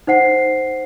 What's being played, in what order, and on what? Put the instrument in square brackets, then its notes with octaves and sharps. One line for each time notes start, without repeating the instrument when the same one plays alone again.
[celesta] D#4 C5 F#5 C7